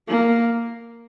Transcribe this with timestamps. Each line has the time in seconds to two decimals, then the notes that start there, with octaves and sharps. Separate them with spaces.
0.08 A#3